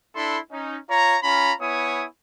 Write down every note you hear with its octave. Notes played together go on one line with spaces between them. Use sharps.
D4 E4 A4 B5 C6
C#4 D#4
F4 C#5 A#5
C#4 F4 A#5 B5
B3 E4 C#5 G#5 D#6